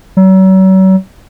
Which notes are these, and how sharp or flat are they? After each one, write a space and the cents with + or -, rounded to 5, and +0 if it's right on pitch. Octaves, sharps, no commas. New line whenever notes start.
F#3 +40